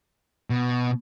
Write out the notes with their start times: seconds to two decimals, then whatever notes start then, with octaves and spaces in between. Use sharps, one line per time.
0.50 B2